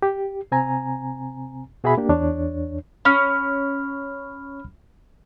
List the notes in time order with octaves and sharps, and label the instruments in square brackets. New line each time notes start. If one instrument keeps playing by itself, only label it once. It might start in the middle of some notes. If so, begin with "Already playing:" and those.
[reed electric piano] G4
C3 C4 G#5 A#5
B2 F#4 G#4 E5 G#5 B5
A#3 D4 G4
E2 D4 C#5
[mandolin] C#4 [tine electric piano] B5 F6